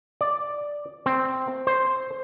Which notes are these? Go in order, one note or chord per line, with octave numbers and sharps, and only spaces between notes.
D5
C4
C5